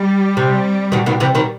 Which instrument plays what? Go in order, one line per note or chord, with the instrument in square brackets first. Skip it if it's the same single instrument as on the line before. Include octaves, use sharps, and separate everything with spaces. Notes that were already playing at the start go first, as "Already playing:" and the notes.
Already playing: [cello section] G3
[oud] C3
B2 D#3
B2 D#3
C3 E3
B2 D#3